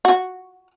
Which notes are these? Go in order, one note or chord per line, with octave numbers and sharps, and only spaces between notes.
F#4